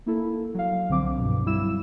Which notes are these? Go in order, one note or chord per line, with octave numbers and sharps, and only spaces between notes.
A#3 E4 A4
F#3 F5
C2 D3 F3 C4 D6
G2 B2
F#3 G3 E4 E6 E7